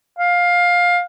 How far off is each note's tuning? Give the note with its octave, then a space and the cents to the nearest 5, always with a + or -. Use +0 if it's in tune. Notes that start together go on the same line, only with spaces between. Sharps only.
F5 +15